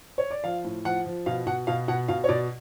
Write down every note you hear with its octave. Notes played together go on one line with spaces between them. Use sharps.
C#5
D5
F3 F5
A2
F3 F#5
F3
B2 F5
B2 F#5
B2 F5
B2 F#5
B2 F5
C#5
B2 D5